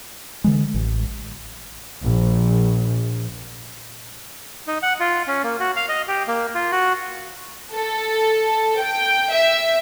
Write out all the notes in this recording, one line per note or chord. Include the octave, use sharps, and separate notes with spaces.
D3 E3 G#3
A1
A#1
D#4
F#5
F4
C#4
A#3
F#4
F5
D#5
G4
A#3
F4
F#4
A4
G5
E5